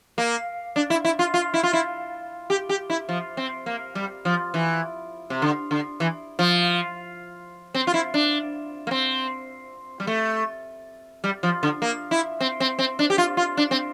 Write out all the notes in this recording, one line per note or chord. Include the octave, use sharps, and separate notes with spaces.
A#3
D4
E4
E4
F4
F4
E4
F4
E4
G4
G4
E4
F3
C4
A#3
G3
F3
E3
C3
D3
D3
E3
F3
C4
F4
E4
D4
A#3
C4
G3
A3
G3
F3
D3
A#3
E4
C4
C4
C4
D4
G4
F4
F4
D4
C4